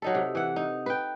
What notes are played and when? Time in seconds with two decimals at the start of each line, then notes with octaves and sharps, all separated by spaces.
0.02 F#3 D#4 A4
0.14 C3
0.35 E3 F#5
0.56 D#4
0.86 B4 G5